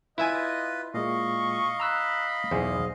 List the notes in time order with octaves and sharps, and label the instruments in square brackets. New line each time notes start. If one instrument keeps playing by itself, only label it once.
[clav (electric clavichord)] E4 E5 G#5 [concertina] F4 B4 [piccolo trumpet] D#5
[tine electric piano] A#2 G#3 [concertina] D#5 F5 [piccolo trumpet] C#6
[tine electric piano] A#5 E6 F#6 [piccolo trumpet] B5
[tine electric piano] B1 G#4 C5 [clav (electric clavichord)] E2